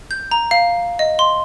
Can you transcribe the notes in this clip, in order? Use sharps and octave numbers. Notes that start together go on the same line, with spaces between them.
G6
A#5
F5
D#5
C6